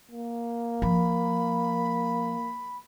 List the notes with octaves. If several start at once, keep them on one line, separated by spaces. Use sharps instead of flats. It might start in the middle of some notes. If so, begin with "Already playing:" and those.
A#3
F3 B5